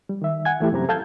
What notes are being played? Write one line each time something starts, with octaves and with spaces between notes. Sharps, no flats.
G3
D#3 E5
F#5 G#5 G#6
E3 A3 E4 G4
F#2 C3 C4 G4 A#5
A4 F5 A5 G6 G#6